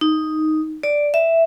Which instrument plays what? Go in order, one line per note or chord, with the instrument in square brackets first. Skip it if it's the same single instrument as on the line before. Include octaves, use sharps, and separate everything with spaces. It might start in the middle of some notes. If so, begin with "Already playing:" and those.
[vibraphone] D#4
D5
E5